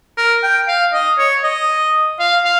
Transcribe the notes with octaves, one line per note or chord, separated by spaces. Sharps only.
A#4
G5
F5
D#5
C#5
D#5
F5
F5